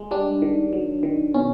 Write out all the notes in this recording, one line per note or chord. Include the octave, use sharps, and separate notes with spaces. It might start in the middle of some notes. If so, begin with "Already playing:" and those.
Already playing: G#3
G3 D4
D#3
F#3
D#3
B2 C#4